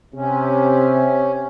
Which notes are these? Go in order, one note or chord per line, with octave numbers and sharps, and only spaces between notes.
C3 C#4